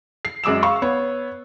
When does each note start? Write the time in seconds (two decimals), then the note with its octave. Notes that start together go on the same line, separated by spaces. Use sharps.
0.25 C7
0.44 F#2 G#3 D6 E6 E7
0.63 F5 C#6
0.82 B3 C#5